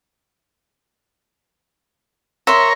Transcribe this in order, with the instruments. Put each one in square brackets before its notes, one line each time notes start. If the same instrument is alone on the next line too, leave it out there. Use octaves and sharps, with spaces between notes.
[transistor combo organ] A#4 C#5 [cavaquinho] E5 C6